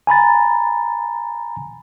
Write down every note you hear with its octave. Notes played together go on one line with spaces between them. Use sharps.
G#5 A#5 B5 A6